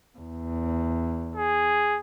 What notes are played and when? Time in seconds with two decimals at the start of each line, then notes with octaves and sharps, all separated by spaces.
0.19 E2
1.36 G#4